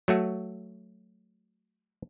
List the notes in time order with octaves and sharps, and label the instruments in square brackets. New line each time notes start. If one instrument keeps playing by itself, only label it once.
[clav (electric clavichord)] F#3 A3 F#4